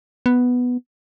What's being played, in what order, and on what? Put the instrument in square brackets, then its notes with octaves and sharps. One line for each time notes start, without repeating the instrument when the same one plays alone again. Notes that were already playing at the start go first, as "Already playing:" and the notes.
[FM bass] B3